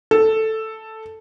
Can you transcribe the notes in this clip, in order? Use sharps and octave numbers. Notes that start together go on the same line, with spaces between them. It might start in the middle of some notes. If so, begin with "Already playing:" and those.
A4